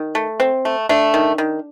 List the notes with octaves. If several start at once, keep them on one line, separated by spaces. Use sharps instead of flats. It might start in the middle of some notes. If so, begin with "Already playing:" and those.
Already playing: D#3
A3
C4
A3
A3 D4
D#3
D#3